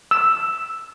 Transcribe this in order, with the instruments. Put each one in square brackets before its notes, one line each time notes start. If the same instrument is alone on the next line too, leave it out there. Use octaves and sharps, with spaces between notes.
[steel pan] E6